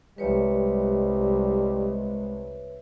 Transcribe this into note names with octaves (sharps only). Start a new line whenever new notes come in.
C2 G3 G#3 B4 C#5 E5